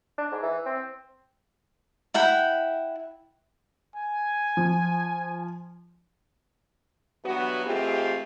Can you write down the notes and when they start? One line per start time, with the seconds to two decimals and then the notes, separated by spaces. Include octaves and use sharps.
0.18 D4
0.31 G#2
0.43 E3
0.66 C4
2.14 E4 F#5 G5 B5
3.95 G#5
4.57 F3
7.24 G2 E3 F#3 B3 F#4
7.65 E3 G#3 A3 C4 F4 G4